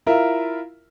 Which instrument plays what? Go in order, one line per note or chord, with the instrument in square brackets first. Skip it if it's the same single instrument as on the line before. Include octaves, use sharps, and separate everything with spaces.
[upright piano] E4 F4 A#4 E5